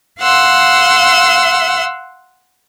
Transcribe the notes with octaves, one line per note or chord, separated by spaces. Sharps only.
F5 F#5 C6 E6